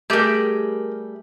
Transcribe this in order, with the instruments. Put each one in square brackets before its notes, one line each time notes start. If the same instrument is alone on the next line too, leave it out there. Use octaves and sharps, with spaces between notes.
[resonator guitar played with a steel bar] G3 G4 G#4 [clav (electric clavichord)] A3 [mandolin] A#4 G6